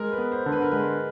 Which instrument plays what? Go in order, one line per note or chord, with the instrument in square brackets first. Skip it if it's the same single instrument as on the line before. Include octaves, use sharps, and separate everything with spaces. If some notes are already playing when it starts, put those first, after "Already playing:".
Already playing: [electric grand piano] G#3 [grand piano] A#4
[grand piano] B4
[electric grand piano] B3
[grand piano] C5
[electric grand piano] D3
[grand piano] B4
A#4
[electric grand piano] G#3 [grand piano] B4